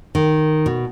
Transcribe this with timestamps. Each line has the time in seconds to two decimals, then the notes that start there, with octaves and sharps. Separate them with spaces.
0.15 D#3
0.66 B2